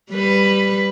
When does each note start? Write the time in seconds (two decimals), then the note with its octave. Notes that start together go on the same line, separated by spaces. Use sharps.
0.12 G3 B4